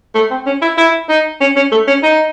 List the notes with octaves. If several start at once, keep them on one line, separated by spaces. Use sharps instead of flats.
A3
C4
C#4
E4
E4
D#4
C#4
C#4
A3
C#4
D#4